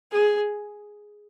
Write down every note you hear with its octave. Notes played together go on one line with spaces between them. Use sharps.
G#4